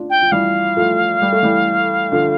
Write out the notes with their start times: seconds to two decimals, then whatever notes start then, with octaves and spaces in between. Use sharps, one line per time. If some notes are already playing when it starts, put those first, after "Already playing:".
Already playing: D4 F4
0.10 G5
0.22 F3
0.32 E3 G3 F5
0.77 F3 A3
1.22 G3
1.32 A3
1.43 E3 G3
2.12 D3 F3